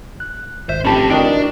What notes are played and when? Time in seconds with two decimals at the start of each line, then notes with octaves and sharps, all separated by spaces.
0.20 F#6
0.69 G#1 C5 E5
0.85 F1 C#4 G4 G5 A5 B5
1.10 D4 E4 F#4 A#4 D5 D#5 G5 D#6